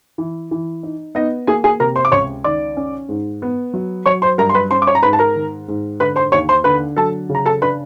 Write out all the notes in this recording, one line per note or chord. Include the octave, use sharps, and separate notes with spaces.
E3
E3
D#4
B3 D#4 D#5
A#3 G#4 G#5
G#4 G#5
C3 A#4 A#5
C5 C6
D6
C#2 C#5 C#6
D#3 D5 D6
C#4
G#2
B3
F#3
F#3 C#5 C#6
C5 C6
G2 A#4 A#5
C6
B4 B5
C#4 C5 C6
D6
C#5 C#6
A#5
G#2 B4 B5
A5
A#4 A#5
D#3
G#2
D3 B4 B5
C5 C6
D#2 C#5 C#6
C5 C6
D3 B4 B5
F#3 A4 A5
C#3
A#5
A4 A5
D4 B4 B5